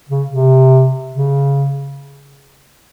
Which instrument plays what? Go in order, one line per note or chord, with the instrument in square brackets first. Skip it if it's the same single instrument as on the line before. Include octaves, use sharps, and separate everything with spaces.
[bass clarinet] C#3
C3
C#3